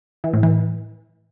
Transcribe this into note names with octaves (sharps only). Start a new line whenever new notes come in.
E3
A2
E3